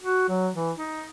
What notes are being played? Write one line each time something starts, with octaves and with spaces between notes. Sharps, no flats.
F#4
F#3
E3
D#4